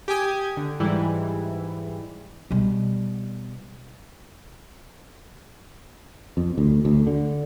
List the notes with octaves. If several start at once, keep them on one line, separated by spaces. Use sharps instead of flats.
G4 G5 G#5 D#6 G#6
D3
G#2 E3 G3 E4
B2 G3
F2
D2
D2
D3